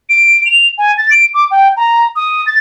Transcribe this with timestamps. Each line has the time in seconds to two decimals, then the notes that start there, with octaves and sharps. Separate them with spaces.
0.10 D7
0.46 F7
0.78 G#5
0.98 A6
1.11 D7
1.34 D6
1.51 G5
1.77 A#5
2.16 D#6
2.47 A6